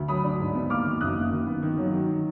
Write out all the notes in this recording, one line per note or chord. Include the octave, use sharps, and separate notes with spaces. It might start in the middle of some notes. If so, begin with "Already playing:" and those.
Already playing: D2
F#3 B5 D#6
D4
G#2
B3
A#3 D6 F6
D#3
F#1 D#6 F#6
A#3
D#3
B3
D#3
F#3
D#3